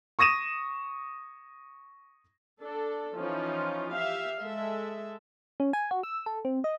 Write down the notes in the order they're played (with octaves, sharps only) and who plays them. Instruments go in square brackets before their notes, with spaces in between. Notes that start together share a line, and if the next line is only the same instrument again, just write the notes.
[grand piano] C#6 D#6 A#6 D#7 E7
[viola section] D4 A4
E3 F3 C#4 D#4 F4
G4 E5 F5
G#3 A4 E5
[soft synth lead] C#4
G#5
F#4
E6
A4
C4
D#5